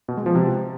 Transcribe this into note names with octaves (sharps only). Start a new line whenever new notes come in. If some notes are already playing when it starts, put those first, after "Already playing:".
B2
G#3
F3
C3